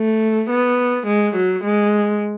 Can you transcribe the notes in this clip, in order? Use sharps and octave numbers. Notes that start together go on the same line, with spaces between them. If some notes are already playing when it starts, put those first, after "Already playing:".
Already playing: A3
B3
G#3
F#3
G#3